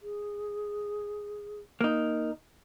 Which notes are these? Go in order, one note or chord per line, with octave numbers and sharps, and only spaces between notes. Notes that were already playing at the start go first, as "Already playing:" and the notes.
G#4
A#3 D#4